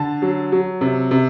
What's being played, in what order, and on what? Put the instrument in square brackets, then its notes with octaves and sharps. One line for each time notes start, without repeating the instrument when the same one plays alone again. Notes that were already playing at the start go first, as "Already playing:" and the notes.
Already playing: [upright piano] D3 A5
F#3
F#3
C3
C3